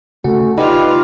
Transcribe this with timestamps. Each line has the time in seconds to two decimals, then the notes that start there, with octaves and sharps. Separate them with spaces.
0.24 C#3 A3 F#4
0.58 G3 D#4 F4 B4